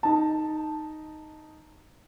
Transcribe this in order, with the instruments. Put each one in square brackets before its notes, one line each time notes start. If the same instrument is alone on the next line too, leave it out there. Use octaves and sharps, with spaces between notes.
[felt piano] D#4 A5